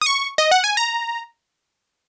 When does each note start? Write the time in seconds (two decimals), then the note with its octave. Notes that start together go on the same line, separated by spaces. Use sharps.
0.01 D#6
0.06 C#6
0.38 D#5
0.51 F#5
0.64 G#5
0.77 A#5